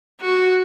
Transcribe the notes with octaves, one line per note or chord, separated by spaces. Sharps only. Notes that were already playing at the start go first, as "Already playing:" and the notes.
F#4